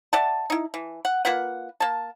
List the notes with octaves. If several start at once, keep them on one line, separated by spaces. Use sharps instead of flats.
D5 E5 F#5 A5
D#4 E4
E3
F#5
A#3 F4 B4 F#5
A#3 A5